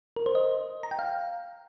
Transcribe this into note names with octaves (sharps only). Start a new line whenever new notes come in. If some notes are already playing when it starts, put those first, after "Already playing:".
A#4
C5
D#5
A#5
G5
F5